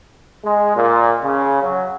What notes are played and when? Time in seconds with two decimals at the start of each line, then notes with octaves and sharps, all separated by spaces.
0.44 G#3
0.76 A#2
1.22 C#3
1.62 F#3